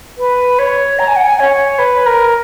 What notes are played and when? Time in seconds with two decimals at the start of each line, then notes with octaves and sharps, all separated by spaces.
0.17 B4
0.58 C#5
0.98 A#5
1.07 G#5
1.15 F#5
1.24 G#5
1.39 C#5
1.78 B4
2.06 A#4